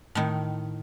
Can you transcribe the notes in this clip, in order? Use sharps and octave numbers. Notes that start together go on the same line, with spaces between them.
A2 D#3